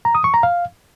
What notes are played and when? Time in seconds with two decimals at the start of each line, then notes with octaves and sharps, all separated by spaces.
0.05 A#5
0.15 D#6
0.24 C#6
0.34 A#5
0.43 F5